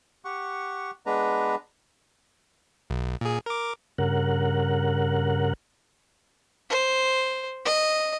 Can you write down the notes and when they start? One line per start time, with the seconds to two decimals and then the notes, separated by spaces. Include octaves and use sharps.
0.25 G4 F#5 C#6
1.06 G#3 B3 D4 B4 A#5
2.90 B1
3.21 A#2 G#4
3.46 A#4 D6
3.98 G2 C#3 A#4 F#5
6.70 C5
7.65 D#5